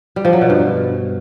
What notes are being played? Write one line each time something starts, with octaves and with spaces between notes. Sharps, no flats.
G3
F3
F#3
B2
G2